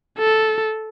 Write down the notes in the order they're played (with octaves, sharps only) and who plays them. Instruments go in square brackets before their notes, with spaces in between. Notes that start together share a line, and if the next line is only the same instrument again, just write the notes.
[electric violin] A4